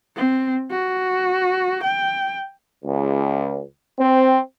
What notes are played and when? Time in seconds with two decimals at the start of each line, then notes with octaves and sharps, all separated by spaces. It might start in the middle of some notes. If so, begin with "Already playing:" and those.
0.16 C4
0.71 F#4
1.83 G5
2.85 C#2
3.98 C4